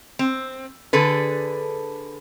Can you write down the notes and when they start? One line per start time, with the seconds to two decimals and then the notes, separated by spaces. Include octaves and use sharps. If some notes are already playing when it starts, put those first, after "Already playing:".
0.19 C4
0.93 D3 G#4 A4 B4